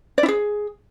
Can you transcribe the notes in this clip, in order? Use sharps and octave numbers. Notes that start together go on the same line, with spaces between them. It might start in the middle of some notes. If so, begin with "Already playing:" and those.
D5
E4
G#4